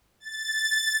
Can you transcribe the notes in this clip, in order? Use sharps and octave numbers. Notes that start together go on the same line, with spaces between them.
A6